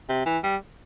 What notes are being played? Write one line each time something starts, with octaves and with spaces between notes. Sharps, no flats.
C3
E3
G3